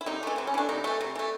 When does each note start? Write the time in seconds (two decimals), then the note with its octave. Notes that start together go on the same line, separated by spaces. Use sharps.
0.01 E4
0.06 C3 D#4
0.23 E3 A3
0.36 C3 C4
0.47 C#4
0.54 E3 A3 D4
0.69 C3 D#4
0.84 E3 A3
1.01 C3
1.15 E3 A3